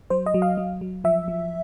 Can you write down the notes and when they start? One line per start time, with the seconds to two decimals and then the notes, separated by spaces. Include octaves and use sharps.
0.10 F#3 C5
0.26 D#5
0.34 F#3
0.42 F5
0.57 F#3
0.81 F#3
1.04 F3 E5
1.28 F3